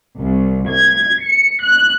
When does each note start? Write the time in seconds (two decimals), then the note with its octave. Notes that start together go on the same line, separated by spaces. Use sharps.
0.20 C2
0.70 G#6
1.25 C#7
1.64 F#6